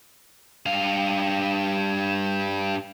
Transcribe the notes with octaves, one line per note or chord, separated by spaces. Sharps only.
G2 F5